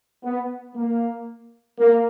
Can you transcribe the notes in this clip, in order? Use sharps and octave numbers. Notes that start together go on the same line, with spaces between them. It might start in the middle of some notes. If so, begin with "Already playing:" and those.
B3
A#3
A#3